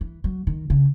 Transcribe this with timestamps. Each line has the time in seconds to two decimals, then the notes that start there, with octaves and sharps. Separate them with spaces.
0.01 E3
0.24 F#3
0.47 D#3
0.70 C#3